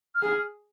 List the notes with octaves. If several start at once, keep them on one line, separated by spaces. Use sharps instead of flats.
F6
G#4